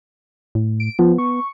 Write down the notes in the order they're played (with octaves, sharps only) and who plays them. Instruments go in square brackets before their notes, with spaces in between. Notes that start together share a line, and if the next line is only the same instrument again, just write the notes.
[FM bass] A2
[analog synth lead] D7
[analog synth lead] F3 [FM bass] B3
[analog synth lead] C#6